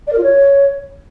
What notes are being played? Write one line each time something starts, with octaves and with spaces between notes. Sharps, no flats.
D5
A#4
F4
C#5